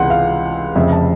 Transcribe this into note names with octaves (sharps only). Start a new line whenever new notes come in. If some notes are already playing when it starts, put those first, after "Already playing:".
Already playing: C#2 C3 E3 G#3 F#5 C6
F5
F1 F2 C#3 E5
A5